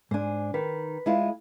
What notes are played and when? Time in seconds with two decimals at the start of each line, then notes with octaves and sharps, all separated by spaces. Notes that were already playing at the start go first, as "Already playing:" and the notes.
0.11 G#2 D4 C5 G#5
0.54 D#3 B4
1.06 G#3 E4 F4